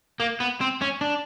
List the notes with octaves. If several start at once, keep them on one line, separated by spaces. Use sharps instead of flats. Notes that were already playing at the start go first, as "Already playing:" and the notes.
A#3
B3
C4
C#4
D4